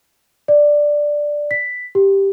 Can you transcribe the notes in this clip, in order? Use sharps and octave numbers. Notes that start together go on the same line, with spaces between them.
D5
B6
G4